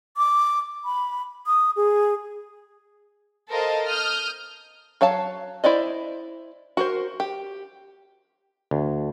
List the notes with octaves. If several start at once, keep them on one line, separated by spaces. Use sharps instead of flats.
D6
B5
D#6
G#4
A4 A#4 C5 D#5 F5 A5
D#6 F6 G6
F#3 C#5 F5 A5
E4 C5 D5 D#5
F#4 A#4 C5
G4
D2